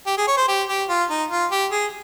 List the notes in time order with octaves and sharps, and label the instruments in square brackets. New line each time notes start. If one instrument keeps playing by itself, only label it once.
[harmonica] G4
G#4
C#5
C5
G4
G4
F4
D#4
F4
G4
G#4